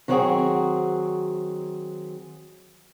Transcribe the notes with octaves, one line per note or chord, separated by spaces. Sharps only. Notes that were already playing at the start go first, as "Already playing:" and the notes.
D#3 F#3 B3 C4 F#4 G#4